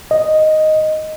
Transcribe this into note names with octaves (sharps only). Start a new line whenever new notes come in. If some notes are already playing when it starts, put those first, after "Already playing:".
D#5